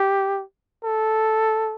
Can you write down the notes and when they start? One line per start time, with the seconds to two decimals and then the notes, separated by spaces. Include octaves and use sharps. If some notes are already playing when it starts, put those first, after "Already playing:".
Already playing: G4
0.84 A4